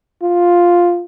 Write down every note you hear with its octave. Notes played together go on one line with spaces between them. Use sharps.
F4